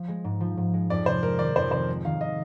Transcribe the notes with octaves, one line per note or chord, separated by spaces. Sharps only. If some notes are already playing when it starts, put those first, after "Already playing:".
Already playing: F3
G#3
G#2
F3
G#2
G#3
F2 D5
C3 C5
G#3 A#4
D#3 D5
F2 C5
C3 C5
G#3
D#3 F5
D#5